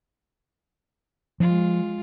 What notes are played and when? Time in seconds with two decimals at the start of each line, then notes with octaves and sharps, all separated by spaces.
1.40 F3 G#3 F4